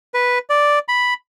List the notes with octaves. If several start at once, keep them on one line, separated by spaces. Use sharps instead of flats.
B4
D5
B5